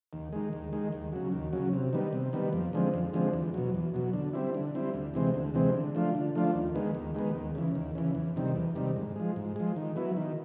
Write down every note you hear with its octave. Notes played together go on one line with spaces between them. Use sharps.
D#2
D#3 G#3
D#2
D#3 G#3
D#2
C#3 F#3
D#2
C#3 F#3
C3
D#3 G3 B3
C3
D#3 G3 B3
F2
D3 F3 G#3 C4
F2
D3 F3 G#3 C4
E2
B2 F#3
E2
B2 F#3
D3
G3 C4 E4
D3
G3 C4 E4
D2
C3 E3 G#3 C4
D2
C3 E3 G#3 C4
D3
F3 A3 D4 F4
D3
F3 A3 D4 F4
D#2
D#3 G#3 B3
D#2
D#3 G#3 B3
D#2
C#3 E3
D#2
C#3 E3
E2
C3 D#3 G3
E2
C3 D#3 G3
G#2
F3 G#3
G#2
F3 G#3
D#3
F#3 B3 E4
D#3